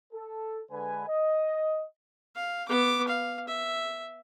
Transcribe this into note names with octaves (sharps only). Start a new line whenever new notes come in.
A4
D3 G#3 B4 G#5
D#5
F5
B3 D6
F5
E5